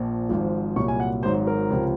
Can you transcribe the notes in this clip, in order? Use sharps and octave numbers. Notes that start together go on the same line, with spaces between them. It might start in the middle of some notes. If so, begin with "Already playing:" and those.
Already playing: A#1 A#2 F3
G#1 G#2 F3
C2 A#2 F#3 C#6
G#5
F#5
G#1 G#2 F#3 C5
A#4
C#2 C3 F3